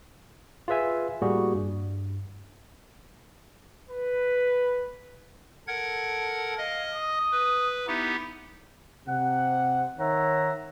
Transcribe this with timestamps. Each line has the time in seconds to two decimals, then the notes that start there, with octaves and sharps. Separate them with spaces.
0.68 F4 G#4 B4 E5 G#5
1.22 A2 G3 A#3 F#4 G#4
1.55 G2
3.90 B4
5.68 A4 A#4 F#5 G#6
6.58 D#5 F5
6.94 D#6
7.32 B4
7.87 B3 D#4 E4 G4
9.07 C3 F#5
9.99 D#3 C#5 E5 F#5 A#5